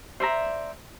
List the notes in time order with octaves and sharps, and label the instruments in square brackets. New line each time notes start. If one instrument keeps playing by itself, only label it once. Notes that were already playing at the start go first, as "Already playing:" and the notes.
[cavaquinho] C5 D5 E5 A#5